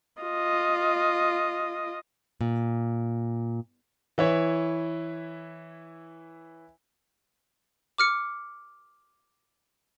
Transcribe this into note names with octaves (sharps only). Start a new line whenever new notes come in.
F4 D#5
A#2
E3 E4 C#5
D6 F6 C#7